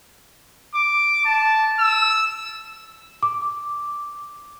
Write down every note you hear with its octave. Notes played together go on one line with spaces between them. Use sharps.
D6
A5
E6
D6